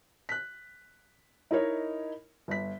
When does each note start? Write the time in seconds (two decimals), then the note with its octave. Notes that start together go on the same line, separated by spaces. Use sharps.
0.29 F#6 B6
1.51 D#4 E4 A#4 C#5 D#5
2.48 G1 B6